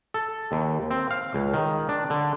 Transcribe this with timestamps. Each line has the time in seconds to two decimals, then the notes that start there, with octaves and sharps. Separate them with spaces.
0.14 A4
0.52 D#2
0.91 C4
1.11 F5
1.34 C#2
1.54 D#3
1.89 D4
2.10 D3